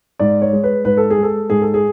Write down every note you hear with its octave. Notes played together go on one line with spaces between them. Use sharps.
G#2 D5
C#5
G#3
B4
G#2 B4
A4
G#4
G#3 A4
G#2 G#4
A4
G#4